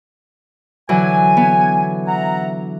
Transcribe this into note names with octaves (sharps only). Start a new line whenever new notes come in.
D3 E3 F#3 G#5
B3
E5 F#5 A#5